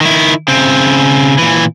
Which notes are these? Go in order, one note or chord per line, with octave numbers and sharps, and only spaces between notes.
D#3 E4
C#3 C4
A#2 E3